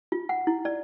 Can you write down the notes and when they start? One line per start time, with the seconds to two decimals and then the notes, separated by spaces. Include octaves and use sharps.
0.12 F4
0.29 F#5
0.47 E4
0.65 D5